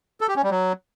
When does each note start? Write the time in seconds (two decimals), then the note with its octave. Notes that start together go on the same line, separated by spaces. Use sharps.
0.21 A4
0.28 G4
0.36 C#4
0.43 G3
0.50 F#3